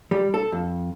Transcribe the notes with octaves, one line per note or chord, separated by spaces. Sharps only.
G3
A4
F2